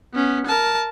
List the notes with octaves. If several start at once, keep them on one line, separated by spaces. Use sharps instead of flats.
B3 C#4
A#4 A5